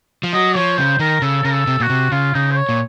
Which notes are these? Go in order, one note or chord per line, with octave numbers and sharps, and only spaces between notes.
F3
F#3 D#5
F3 C#5
C#3 C5
D#3 A#4
C#3 A4
C#3 A#4
A4
C3
A#2 F#4
C3
C#3 F4
C#3 D#4
C5
C#5
A#2